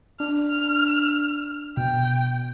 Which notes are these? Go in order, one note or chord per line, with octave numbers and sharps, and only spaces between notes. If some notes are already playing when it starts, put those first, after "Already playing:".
D4 F6
B2 G5